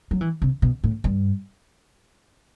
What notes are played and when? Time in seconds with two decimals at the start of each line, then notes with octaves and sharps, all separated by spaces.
0.11 F#3
0.21 E3
0.42 C3
0.62 B2
0.84 A2
1.04 G2